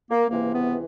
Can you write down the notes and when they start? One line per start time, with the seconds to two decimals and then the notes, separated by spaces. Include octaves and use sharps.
0.10 A#3
0.29 C#2 C3 E3 A#3
0.53 B3